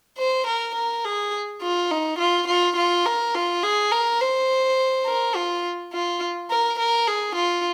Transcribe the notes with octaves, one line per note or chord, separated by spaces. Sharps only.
C5
A#4
A#4
G#4
F4
D#4
F4
F4
F4
A#4
F4
G#4
A#4
C5
A#4
F4
F4
A#4
A#4
G#4
F4